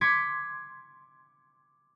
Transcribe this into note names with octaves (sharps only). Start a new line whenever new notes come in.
C6 D6 G#6 B6 C#7